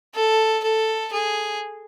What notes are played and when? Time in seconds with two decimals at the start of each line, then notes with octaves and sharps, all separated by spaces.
0.15 A4
0.63 A4
1.13 G#4